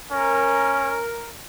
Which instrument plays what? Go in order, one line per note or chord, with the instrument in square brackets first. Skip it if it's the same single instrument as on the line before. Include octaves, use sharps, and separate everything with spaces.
[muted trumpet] C#4 [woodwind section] A#4